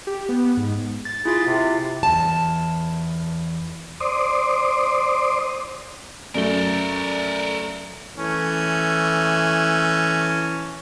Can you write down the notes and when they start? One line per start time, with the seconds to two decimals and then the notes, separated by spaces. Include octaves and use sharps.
0.07 G4
0.29 B3
0.57 G#2
1.05 A6
1.25 E4 F4 G#4 A6
1.46 C3
2.03 E2 A5
4.00 C5 D5 C6 D6 D#6
6.35 F#2 A3 A4 A#4 D5 G7
8.17 E3 A3 C#4